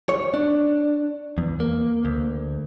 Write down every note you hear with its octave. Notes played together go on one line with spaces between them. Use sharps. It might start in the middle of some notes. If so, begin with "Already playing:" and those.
C#5
D4
E2
A#3
D2